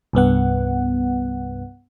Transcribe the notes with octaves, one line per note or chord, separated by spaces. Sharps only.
C2 G2 B3 F#5